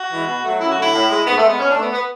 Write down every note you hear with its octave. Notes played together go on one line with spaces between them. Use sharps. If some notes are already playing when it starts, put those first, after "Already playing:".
Already playing: F#4
E3 G#3
B2
F#3 A3
F#2 E4
F#4
D3 F#3 A3
E4
A2
G#3
G#2 B3
A3
G#3
B3
B2 C#4
D4
A3
B3
B3